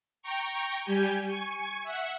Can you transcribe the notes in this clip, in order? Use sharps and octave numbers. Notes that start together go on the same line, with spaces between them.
G5 A#5 C#6
G3 G4 G#5 G6
G#5 C#6
E5 F#5